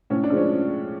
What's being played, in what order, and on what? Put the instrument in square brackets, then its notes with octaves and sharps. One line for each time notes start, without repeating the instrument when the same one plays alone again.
[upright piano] A2 C#4
D4
F3 G#3
C#4